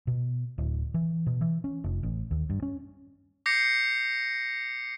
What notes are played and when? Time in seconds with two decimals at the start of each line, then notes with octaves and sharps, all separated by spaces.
0.07 B2
0.58 D1
0.94 E3
1.26 B2
1.41 E3
1.64 C#4
1.84 F1
2.03 A1
2.31 D#2
2.50 G2
2.62 C#4
3.46 D6 G6 A#6 C7 C#7